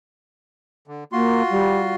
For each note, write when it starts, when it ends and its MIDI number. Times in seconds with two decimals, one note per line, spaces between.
0.88 1.04 50
1.12 1.43 58
1.12 1.96 65
1.12 1.96 66
1.12 1.96 84
1.50 1.95 55